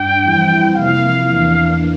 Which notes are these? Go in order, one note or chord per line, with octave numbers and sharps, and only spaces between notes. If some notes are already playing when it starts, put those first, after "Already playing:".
Already playing: G2 D4 G5
F2 E3 G3 C4 E4
C3 F3 A#3 E4 F5
E2 E3 A#3 D4